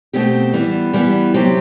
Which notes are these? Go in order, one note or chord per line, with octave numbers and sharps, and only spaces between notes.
B2 A3 C4 G4
E3 G3 B3
E3 G3 B3
C3 F#3 C4 G4